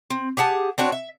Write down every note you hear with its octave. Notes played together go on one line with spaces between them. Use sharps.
C4
G4 G#4 F#5 A5
C4 D4 F#4 C#5
E5